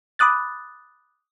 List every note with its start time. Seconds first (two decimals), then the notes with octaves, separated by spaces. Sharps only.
0.19 B5 D6 D#6 F#6 A6